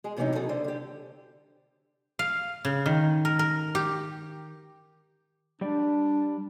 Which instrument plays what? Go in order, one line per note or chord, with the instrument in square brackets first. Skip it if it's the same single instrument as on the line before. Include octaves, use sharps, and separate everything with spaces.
[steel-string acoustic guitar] G#3 G#4
A2 C3 E3 F#3 C#4 D#4
C3 F#3 G#4 A4
D3 G3 C5 E5
D3 G4
[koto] F5
C#3
D#3
A#4
A#4
G4
[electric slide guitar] G3 D5 [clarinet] D4